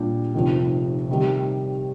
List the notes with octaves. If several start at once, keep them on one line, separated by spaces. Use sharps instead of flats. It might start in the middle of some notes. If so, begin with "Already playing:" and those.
Already playing: A#2 G3 D4 G4
F1 F2 C3 D#3
C3 D#3 G3